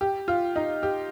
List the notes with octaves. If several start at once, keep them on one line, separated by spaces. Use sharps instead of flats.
G4
F4
D#4
G4